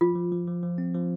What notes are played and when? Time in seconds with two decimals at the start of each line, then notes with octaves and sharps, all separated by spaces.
0.01 F3 F4
0.16 F3
0.32 F3
0.47 F3
0.63 F3
0.78 C4
0.94 F3